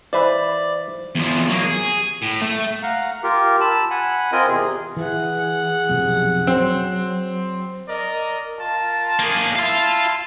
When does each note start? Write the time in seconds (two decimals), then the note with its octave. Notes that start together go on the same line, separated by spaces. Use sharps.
0.13 E3 B4 C5 D5 E5 F5
1.15 E2 F3
1.49 F#3 A#3
1.64 G#4
2.22 A2
2.42 A3
2.83 F5 F#5 A#5
3.23 F4 G4 A#4
3.61 A5 B5 E6
3.90 F#5 G#5 B5
4.32 C4 F4 A#4 D#5 G#5
4.48 E2 C3 G#4
4.97 E3 G#4 F#5
5.89 B1 F2 C3
6.47 F#3 C4
7.89 A#4 D5 D#5
8.58 F4 A#4 A5
9.19 A#3 G#4
9.56 E4 F5 A5 C6